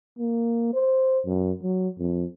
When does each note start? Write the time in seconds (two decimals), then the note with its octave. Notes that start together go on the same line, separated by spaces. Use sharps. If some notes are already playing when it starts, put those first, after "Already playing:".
0.19 A#3
0.74 C5
1.26 F#2
1.63 F#3
1.99 F2